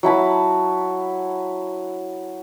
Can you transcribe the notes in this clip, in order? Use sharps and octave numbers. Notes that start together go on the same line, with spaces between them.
F#3 E4 A5 B5